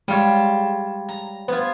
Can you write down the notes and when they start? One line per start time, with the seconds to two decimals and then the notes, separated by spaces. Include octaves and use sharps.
0.08 G3 G#3 F4 C#5 E7
1.09 A#5
1.48 B3 F4 B4 C5 G#6